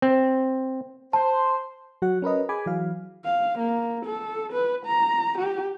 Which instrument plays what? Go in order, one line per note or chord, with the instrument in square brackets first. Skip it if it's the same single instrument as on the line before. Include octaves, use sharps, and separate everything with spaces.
[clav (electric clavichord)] C4
[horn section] C5 [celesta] A5
[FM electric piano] F#3 F#4 F#5
C#4 A#4 B4 D#5
G#4 G#5 B5 D6
E3 F#3 F5
[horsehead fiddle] F5
A#3
A4
B4
A#5
G4